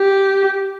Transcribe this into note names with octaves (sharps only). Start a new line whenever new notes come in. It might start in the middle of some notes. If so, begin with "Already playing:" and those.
Already playing: G4